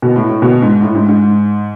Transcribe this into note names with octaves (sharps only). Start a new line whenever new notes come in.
B2
A2
A2
B2
G#2
A2
G#2
G#2